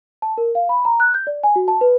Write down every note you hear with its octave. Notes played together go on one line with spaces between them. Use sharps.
A5
A#4
F5
B5
A#5
F#6
G6
D5
G#5
F#4
A5
B4